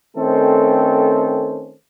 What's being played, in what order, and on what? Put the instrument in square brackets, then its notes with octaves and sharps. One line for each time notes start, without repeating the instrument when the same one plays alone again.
[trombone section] D#3 A3 C4 C#4 A4 C5